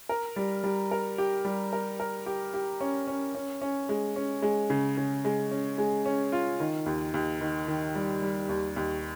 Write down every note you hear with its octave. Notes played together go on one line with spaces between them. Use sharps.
A#4
G3
G3
A#4
G4
G3
A#4
A#4
G4
G4
C#4
C#4
C#4
C#4
G#3
C#4
G#3
C#3
C#3
G#3
C#4
G#3
C#4
F4
D#3
D#2
D#2
D#3
D#3
G3
G3
D#2
D#2